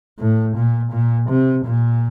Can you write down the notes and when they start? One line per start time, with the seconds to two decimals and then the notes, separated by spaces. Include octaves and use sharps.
0.19 A2
0.56 A#2
0.92 A#2
1.29 C3
1.65 A#2